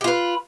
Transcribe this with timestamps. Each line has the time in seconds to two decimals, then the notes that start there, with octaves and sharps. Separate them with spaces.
0.01 G4
0.04 F4
0.08 B4